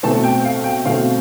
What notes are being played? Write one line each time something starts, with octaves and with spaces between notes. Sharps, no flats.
B2 A3 C4 A5
G5
F5
G5
B2 A3 C4 F5